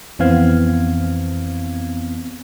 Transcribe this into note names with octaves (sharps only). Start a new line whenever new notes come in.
F2 E3 B3 C4 F5 G#6